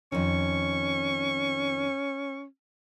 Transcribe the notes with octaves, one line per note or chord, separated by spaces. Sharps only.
F2 D#3 C#4 C#6